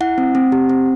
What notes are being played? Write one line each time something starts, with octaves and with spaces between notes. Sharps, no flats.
E4 F#5
C4
C4
G4
C4